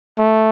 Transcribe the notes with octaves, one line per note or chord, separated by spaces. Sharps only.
A3